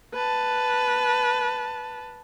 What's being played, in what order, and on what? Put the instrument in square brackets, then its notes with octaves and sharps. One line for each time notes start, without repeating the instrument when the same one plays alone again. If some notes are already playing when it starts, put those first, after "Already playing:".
[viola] B4 A5